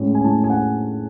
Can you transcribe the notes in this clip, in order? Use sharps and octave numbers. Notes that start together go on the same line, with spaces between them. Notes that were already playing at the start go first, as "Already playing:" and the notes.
Already playing: A2 G#3 C#4
G#5
A2 A5
G#5
F#5